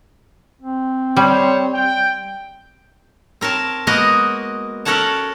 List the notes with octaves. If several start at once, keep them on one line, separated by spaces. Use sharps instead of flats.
C4
G3 C5 C#5
G5
C4 A#4 C#5 A5
G#3 A#3 B3 F#4 A#4 D#5
C#4 A4 A#4 C#5 F#5 A5